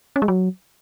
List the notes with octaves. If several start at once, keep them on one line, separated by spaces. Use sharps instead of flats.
C#4
G#3
F#3